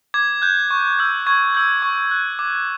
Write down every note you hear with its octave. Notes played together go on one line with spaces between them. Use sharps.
D6 G#6
F#6 G6
C#6
E6 G6
C#6 G#6
E6 G6
C#6
F#6
D6